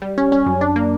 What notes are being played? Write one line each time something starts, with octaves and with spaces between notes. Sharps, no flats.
G3
C#4
C#4
F#2
D4
A#3